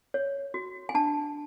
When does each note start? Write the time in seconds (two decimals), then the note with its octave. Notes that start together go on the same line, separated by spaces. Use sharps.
0.14 C#5
0.54 F#4
0.89 G#5
0.95 D4 A5